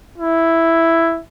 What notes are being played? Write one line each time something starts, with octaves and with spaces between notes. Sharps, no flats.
E4